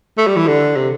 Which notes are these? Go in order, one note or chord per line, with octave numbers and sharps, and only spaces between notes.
A3
G3
E3
D3
C3